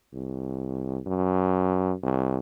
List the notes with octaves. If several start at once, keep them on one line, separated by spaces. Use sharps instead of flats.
C2
F#2
C2